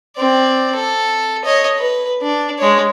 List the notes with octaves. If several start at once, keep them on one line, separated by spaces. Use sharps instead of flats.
C4 D5
A4
C#5 D#5
B4
D4
G#3 C#5